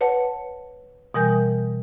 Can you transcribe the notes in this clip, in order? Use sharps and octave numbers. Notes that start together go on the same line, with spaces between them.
B4 C#5 F#5 A5
B2 E3 G3 A#4 G#5 G6